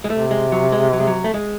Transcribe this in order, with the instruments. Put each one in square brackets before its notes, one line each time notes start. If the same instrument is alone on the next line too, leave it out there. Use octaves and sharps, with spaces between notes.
[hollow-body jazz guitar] G#3
[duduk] C3 [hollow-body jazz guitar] A3
[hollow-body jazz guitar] G#3
F#3
G#3
F#3
G#3
F#3
A3
G#3